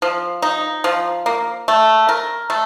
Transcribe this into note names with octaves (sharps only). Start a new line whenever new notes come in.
F3
D#4
F3
A#3
A3
A#4
A3